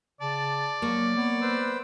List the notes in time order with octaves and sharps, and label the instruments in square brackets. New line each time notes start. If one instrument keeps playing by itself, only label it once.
[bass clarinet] C#3 [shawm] D5 [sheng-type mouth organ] A5
[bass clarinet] F#3 [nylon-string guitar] A#3 [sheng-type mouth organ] C#6
[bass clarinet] B3 [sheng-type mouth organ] C#5
[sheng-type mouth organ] B4 C5 E6